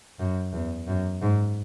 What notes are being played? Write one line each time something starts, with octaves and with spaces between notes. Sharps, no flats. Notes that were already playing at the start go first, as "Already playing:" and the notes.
F#2
E2
F#2
G#2